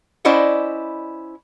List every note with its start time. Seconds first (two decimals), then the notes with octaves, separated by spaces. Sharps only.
0.25 C#4 E4 C5 D5 D#5 F#5